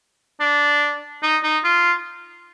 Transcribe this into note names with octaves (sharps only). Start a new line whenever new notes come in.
D4
D#4
D#4
F4